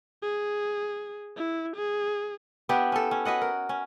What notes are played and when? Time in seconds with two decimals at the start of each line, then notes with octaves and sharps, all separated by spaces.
0.22 G#4
1.36 E4
1.76 G#4
2.69 B3 D4 E4 G4
2.92 C#4 A4
3.11 C#4
3.25 F#4 B4 D#5 F#5
3.42 A#4
3.69 C#4